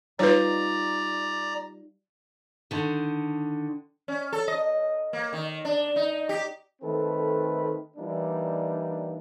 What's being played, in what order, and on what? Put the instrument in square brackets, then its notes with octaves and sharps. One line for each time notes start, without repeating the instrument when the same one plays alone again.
[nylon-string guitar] G3 D#4 F4 [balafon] B4 C#5 [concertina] D5 A#5
[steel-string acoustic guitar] D3 D#3
[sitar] C#4
A4
D#5
A#3
D#3
D4
D#4
G4
[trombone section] D#3 A3 C4 A4 B4
E3 G3 A#3 D4 D#4